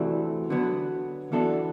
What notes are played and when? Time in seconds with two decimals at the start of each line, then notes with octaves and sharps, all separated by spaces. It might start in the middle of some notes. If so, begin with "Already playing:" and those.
Already playing: C3 E3 A3 D4 F#4
0.50 D3 F#3 B3
1.32 E3 B3 D4 F#4 A4